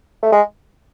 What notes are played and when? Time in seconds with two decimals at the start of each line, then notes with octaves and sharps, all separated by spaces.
0.22 A3
0.32 G#3